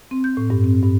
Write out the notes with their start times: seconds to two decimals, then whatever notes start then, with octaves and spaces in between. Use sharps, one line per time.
0.11 C4
0.24 G6
0.37 A2
0.50 G2
0.64 C4
0.83 G2